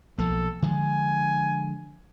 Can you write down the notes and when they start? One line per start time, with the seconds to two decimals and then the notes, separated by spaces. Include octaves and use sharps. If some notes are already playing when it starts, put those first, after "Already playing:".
0.19 B1 F3 A#3 A4
0.62 D3 F3 G#3 G#5